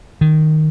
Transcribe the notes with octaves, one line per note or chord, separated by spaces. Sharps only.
D#3